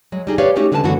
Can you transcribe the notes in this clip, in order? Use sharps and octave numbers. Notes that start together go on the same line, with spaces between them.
F#3 G#3
G3 D#4 G#4
G4 B4 C#5 D5 F5
G#3 A3 C#4 D#4 F#4 G4
D3 G#3 C#4 B4 G#5 A5
F#2 D3 E3 A3 B3 F#4